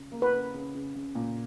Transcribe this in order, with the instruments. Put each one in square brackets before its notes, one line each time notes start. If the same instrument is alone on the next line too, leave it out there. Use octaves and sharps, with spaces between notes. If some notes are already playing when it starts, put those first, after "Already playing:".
Already playing: [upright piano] C#3
A#3
[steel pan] B4
[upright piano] C#3
C#3
C#3
C#3
A#2